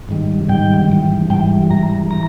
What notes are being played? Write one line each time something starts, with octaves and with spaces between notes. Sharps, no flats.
G#2 D#3 G3
G#2 D#3 G3 G5
G#2 E3 G3
G#2 E3 G3 G5
G#2 E3 G3 A#5
E3 A#5